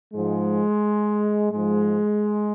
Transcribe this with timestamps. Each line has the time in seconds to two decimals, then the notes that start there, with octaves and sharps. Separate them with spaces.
0.14 G#2 F3 G#3
1.52 G#2 F3 G#3